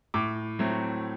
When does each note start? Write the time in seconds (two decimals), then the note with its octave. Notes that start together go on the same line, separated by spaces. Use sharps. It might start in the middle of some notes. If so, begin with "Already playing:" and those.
0.14 A2 D6
0.59 F#3 A3 C4